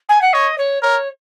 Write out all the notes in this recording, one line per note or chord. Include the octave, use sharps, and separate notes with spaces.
G#5
F#5
C#5 D#5
C#5
A#4 C#5